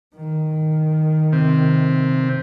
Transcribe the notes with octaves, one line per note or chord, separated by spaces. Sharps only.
D#3
C3